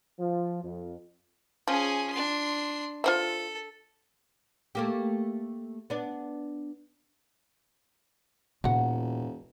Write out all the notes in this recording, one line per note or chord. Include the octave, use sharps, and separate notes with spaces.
F3
F2
F3 C#4 G#4
D4 C6
F4 A4 C5 E5
A3 A#3 G4
B3 D4
E1 A#2 F#3 F4 F#5